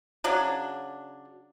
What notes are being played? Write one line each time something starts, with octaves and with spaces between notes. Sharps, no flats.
C#3 F#3 D4